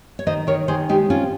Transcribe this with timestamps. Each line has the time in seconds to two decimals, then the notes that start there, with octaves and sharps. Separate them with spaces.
0.19 C#5
0.27 D#3 C5 D#5
0.47 D#3 A#4 C#5
0.68 D#3 G#4 C5
0.89 G#3 D#4 G4
1.10 C4 C#4 F4